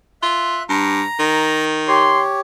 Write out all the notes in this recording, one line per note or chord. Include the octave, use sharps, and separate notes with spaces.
F4 E5 F#6
G2 A#5
D#3
G4 C#5 C6